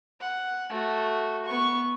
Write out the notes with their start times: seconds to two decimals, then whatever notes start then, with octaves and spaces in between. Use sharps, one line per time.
0.20 F#5
0.70 A3 F#4
1.45 B3 C#6